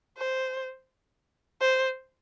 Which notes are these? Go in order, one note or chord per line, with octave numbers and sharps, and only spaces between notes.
C5
C5